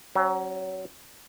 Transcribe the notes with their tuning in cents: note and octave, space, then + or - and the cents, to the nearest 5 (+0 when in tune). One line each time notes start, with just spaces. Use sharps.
F#3 +25 C#4 -30